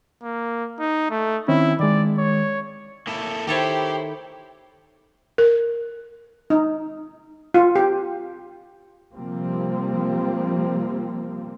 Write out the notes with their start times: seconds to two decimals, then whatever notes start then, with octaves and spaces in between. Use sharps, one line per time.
0.23 A#3
0.79 D#4
1.11 A3
1.48 D#3 C4 C#4 E4
1.80 D#3 G#3 D5
2.18 C#5
3.07 A#3 E4 A4
3.47 D#3 E4 G4 A4 C5 C#5
5.38 A#4
6.50 D#4
7.54 F4
7.76 G4
9.14 C3 F3 G3 A#3 C4